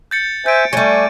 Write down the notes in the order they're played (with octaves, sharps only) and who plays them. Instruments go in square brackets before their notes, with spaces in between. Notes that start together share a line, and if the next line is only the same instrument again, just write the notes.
[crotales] G6 A6 C#7
[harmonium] C5 E5 G#5 [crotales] G6 D7
[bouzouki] F#3 G3 [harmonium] A3 G#5 [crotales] C#6 G6